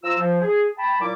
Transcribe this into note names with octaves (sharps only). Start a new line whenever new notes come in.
F3 F4 A#5 E6
F3
G#4
G5 A5 B5
A#2 F#3 G3 E4 D6